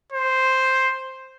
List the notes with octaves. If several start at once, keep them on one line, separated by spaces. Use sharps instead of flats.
C5